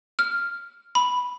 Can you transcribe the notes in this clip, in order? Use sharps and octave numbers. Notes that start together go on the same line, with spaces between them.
F6
B5